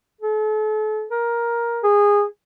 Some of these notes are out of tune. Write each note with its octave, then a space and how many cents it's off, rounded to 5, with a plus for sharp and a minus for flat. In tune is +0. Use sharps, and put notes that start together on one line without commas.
A4 -40
A#4 +10
G#4 -20